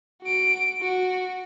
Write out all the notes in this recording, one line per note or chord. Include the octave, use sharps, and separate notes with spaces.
F#4 D7
F#4